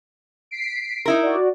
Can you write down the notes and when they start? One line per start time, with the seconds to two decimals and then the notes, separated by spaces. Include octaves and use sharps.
0.51 B6 C7 D7
1.06 D#4 E4 A#4
1.23 F#4 D5